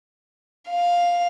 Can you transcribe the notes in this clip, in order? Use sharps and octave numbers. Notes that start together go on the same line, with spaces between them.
F5